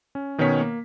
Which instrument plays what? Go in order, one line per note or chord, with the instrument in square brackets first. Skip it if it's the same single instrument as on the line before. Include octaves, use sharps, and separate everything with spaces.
[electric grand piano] C#4
B2 D#3 B3 C#4 C#5 B6
A#3